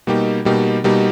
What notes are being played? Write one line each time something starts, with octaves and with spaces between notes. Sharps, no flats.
B2 G3 A#3 D#4 G4
B2 G3 A#3 D#4 G4
B2 G3 A#3 D#4 G4